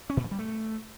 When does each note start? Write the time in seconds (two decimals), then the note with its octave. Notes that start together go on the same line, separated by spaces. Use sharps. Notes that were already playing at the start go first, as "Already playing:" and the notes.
0.10 C#4
0.17 A#2
0.24 F3
0.31 G3
0.39 A3